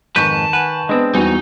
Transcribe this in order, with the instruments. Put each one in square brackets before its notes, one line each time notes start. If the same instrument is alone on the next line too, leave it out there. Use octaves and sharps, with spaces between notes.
[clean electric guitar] F2 G#2 B4 [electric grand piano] D#3 C#6 G6 [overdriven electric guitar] A5
[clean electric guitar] B4 [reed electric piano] F#5 G#5
[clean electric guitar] G#3 C4 [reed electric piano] B3 B4 D#5 [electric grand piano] D4
[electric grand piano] E2 F#4 G#5 [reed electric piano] G3 B3 [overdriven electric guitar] D#4